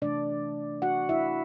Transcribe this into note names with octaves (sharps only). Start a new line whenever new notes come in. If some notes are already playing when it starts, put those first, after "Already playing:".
C3 E3 A3 D4 D5
F#4 F#5
E4 E5